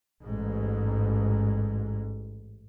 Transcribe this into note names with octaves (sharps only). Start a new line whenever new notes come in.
A1 G#2